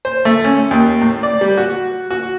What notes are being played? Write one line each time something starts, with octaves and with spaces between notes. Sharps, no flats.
C5
A3
C#4
D#2
A2
D5
G3
F#4
F#4